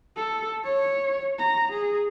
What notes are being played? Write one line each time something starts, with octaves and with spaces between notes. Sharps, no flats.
A4
C#5
A#5
G#4